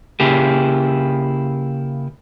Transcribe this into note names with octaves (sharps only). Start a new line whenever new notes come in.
C#3 A#3 E4 G4 G#4